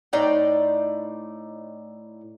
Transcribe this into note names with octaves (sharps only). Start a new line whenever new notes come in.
A2 D#4 D5 G5